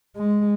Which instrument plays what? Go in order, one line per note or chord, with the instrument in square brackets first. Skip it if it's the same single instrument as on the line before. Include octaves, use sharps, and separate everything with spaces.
[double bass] G#3